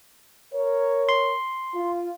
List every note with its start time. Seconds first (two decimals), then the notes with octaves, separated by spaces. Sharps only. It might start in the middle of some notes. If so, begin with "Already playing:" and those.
0.54 A#4 C#5
1.09 C6
1.74 F4